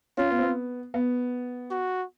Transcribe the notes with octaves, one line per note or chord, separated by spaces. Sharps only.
C#4 F4
B3
C4
B3
B3
F#4